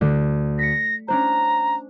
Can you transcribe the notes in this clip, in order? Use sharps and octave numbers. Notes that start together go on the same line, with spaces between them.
D2 D3
A#6 B6 C#7
C#4 D4 C5 A#5